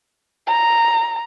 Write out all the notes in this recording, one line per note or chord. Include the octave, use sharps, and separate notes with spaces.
A#5